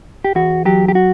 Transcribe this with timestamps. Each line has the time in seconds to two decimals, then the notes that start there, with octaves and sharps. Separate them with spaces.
0.24 G4
0.35 E2 F#4
0.65 F#3 G4
0.88 G4
0.95 F#4